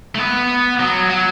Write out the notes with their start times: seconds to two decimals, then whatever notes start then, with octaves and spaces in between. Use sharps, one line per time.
0.15 A3
0.19 B3
0.80 F#3
1.10 F#3